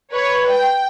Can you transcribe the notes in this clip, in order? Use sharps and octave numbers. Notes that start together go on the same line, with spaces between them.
B4 C#5
G5